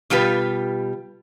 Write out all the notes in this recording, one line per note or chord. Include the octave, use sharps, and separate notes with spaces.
B2 G3 F4 G4 B4